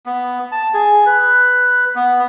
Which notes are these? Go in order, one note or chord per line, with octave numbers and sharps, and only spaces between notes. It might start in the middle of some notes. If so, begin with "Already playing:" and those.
B3
A5
G#4
B4
B3